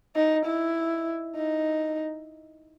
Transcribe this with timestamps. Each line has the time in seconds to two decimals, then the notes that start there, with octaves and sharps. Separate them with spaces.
0.15 D#4
0.45 E4
1.36 D#4